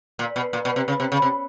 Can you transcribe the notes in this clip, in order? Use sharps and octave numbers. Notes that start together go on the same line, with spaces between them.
A#2
B2
A#2
B2
C3
C#3
C3
C#3
C3